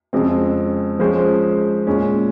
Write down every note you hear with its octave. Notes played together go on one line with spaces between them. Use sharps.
F2 C#3 G#3 C4
F3 G#3 C#4 G#4 C5
A#2 G#3 C#4